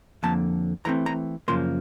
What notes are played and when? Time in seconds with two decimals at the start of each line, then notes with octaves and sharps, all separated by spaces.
0.23 F2 D3 F3 A#3 A5
0.85 E3 A3 C4 A#5
1.06 A#5
1.48 F#2 C#3 F3 A#3 C6